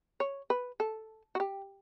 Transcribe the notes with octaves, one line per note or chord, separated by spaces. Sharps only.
C#5
B4
A4
F#4
G4